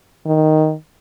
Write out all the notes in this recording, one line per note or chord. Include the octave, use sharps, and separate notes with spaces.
D#3